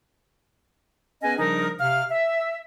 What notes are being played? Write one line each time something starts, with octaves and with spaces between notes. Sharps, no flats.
B3 C#4 G#4 B4 D#5 G#5
C#3 F3 G3 D4 D#4 A#4
C3 F5 F6
E5